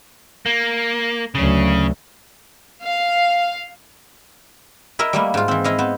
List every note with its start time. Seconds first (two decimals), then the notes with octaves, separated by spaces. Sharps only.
0.46 A#3
1.35 D2 C#3 F#3
2.82 F5
4.99 E4 A#4 D#5 E5
5.13 G3 A3 A#3
5.34 G#2 F4
5.48 E3 C4
5.64 E4 D#5 F5
5.78 B3 C5